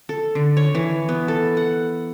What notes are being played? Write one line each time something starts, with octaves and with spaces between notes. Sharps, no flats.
A4
D3
C#5
E3
B3
A4
F#5